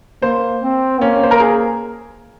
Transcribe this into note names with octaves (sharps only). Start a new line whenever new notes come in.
A#3 C5
C4
A#3 C#4
C5
A#4
G#4